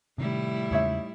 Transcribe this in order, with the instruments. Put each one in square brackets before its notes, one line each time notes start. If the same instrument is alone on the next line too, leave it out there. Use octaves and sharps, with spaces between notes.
[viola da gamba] A2 G3 E4 [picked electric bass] C3 D#3
[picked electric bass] E2 C#3 G#3 [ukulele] D#4 C#5 E5